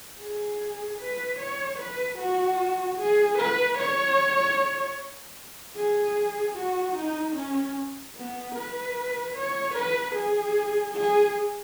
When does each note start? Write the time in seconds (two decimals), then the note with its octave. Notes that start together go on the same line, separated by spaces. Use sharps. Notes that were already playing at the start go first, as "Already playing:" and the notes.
0.20 G#4
0.99 B4
1.39 C#5
1.79 B4
2.19 F#4
2.98 G#4
3.38 B4
3.78 C#5
5.76 G#4
6.56 F#4
6.96 D#4
7.36 C#4
8.16 B3
8.55 B4
9.35 C#5
9.75 B4
10.15 G#4
10.94 G#4